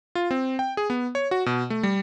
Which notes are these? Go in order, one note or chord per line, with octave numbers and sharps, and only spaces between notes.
F4
C4
G5
G#4
B3
C#5
F#4
B2
A3
G3